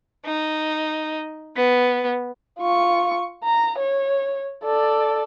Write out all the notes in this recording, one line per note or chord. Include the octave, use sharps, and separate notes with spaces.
D#4
B3
F4 C#6
A#5
C#5
A4 D5